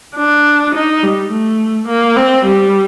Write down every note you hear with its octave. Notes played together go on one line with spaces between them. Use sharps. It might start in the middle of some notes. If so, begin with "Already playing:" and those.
D4
D#4
G3
A3
A#3
C4
G3